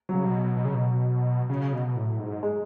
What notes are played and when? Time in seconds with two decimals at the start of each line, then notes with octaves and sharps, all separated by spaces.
0.09 C#3 F#3
0.25 B2
0.56 B2
0.65 C#3
0.75 B2
1.49 C#3
1.73 B2
1.96 A2
2.19 G#2
2.43 G#3